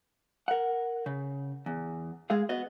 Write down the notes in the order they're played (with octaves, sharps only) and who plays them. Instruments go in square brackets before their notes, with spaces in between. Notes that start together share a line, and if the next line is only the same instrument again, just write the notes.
[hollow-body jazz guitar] A#4 F#5
C#3
E2
G#3 G#4 F5
B3 F#4 D#5